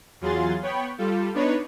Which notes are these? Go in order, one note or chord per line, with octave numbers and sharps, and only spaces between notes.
E2 F#3 F4 G#4 C6 A6
B3 C#5 G5 B5 C#6
G3 F4 A4
B3 D4 D#4 B4 C#5